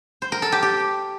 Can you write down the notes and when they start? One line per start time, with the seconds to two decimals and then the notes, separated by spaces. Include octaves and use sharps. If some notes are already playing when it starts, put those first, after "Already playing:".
0.22 C5
0.32 A#4
0.42 A4
0.52 G4
0.62 G4